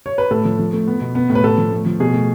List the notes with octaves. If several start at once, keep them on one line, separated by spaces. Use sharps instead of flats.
C#5
B4
A2 A4
F3
F3
A3
B3
B2
B3
A2
B4
A2 A4
F3
A3
F3
B2 G#4
A3